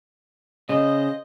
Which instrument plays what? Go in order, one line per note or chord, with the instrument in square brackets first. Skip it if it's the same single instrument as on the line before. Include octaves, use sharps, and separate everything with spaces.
[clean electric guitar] C#3 [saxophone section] G#4 C5 D#5